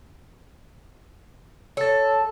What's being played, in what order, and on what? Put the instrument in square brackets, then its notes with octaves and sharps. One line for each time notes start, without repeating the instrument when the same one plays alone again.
[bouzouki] A4 [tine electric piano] C#5 A6